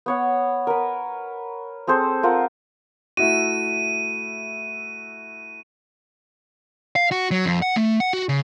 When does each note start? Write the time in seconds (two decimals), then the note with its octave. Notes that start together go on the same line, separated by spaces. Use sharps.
0.06 B3 C#5 F#5
0.67 A#4 B4
1.87 C4 G#4 A4 C5
2.23 F4 A#4 F#5
3.17 A3 E4 F#4 D#7
6.96 F5
7.11 F#4
7.31 F#3
7.46 F2
7.62 F#5
7.76 A3
8.00 F#5
8.13 F#4
8.29 C#3